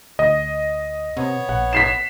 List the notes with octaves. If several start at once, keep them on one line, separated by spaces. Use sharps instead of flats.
D2 D#5
C3 B3 C#5
A#1 F#5
B6 C7 E7